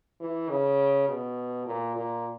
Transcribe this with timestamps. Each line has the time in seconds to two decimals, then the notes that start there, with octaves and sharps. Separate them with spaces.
0.21 E3
0.50 C#3
1.08 B2
1.66 A#2
1.96 A#2